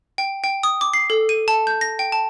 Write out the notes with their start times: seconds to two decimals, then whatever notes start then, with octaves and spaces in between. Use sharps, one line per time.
0.18 G5
0.44 G5
0.63 D#6
0.81 D6
0.94 C7
1.10 A4
1.29 D#7
1.48 A5
1.67 G6
1.81 A#6
1.99 G5
2.12 A5